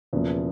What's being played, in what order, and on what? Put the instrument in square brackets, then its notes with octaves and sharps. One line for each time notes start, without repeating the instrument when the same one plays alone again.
[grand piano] E1 E2 C#3 F3 A#3